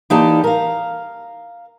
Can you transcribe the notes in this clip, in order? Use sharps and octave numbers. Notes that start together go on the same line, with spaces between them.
E3 A#3 D#4 G4 D5 A5
A#4 F5